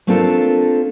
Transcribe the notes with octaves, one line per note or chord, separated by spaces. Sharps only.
A3 A#3 C4 D4 F4 A4